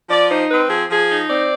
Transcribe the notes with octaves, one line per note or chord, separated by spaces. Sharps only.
F3 D5
D#4 C5
C4 B4
F3 G#4
F3 G#4
D#4
C4 D5